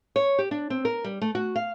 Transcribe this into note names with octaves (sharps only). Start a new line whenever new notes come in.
C#5
G4
D4
C4
A#4
G3
A3
F#4
F5